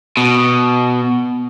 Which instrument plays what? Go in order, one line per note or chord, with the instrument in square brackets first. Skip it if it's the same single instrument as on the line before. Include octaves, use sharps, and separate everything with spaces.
[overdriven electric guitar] B2